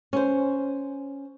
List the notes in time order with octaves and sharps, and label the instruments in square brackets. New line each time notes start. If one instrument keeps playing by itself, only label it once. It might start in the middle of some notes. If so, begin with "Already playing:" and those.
[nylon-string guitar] C#4 C5